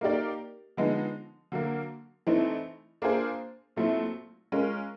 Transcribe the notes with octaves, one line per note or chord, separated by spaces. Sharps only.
A#3 D#4 G4 A#4 D5
D3 F3 G#3 B3 D#4
D3 F#3 A#3
E3 A3 C4 D#4
A#3 D4 F4 G#4 C5
A#2 F#3 A3 C4 E4
G#3 C#4 F4 A#4